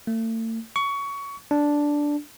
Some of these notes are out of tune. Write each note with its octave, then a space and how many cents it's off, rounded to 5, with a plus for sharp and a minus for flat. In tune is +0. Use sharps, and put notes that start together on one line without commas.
A3 +40
C#6 +20
D4 -5